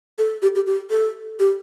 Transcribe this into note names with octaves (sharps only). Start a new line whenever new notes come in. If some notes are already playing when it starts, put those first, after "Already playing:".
A4
G4
G4
G4
A4
G4